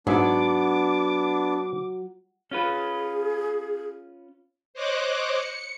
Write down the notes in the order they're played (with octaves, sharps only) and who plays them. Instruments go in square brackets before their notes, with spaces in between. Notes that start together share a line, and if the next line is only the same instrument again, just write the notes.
[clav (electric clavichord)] G#2 G#4 E5 [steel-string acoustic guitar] F#3 [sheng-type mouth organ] B3 D4 [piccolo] D6
[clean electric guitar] C#4 F4 B4 [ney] G#4
[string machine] C5 C#5 D#5 D6 F#6
C#7